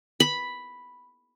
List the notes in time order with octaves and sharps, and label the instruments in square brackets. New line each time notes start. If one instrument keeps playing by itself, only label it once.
[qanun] B5